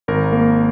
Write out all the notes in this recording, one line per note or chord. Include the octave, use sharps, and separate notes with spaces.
G#1 A#4
A#3